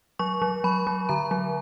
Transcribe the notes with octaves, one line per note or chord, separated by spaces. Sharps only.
F#3 C#6
F#3
F#3 B5
F#3
D3 A#5
F#3